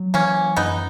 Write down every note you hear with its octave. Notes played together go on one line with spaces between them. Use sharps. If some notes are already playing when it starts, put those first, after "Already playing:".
Already playing: F#3
E3 A#3 C#4
F#2 B3 D#4